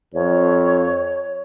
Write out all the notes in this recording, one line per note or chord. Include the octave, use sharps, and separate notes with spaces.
F2 C#5